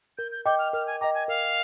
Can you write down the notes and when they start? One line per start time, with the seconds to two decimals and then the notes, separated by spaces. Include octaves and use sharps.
0.18 A#4 G6
0.32 G6
0.46 D#5 G5 D6 G6
0.59 F6
0.73 A#4 F6
0.87 G#5
1.01 D#5 G5 A#5 D6
1.14 G#5
1.28 A#4 F5